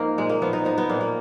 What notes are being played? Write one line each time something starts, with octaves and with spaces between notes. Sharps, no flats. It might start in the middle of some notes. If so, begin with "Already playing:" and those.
Already playing: G#2 F3 A#3 D#4
A#2 G#3
A#3
F3 B3
D#4
F3 D#4
B3
A#2 A#3
A#3